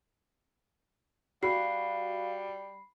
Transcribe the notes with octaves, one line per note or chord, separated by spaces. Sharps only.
G3 F#4 F5 B5 C7